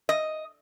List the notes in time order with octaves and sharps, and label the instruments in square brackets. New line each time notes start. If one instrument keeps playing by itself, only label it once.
[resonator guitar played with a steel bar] D#5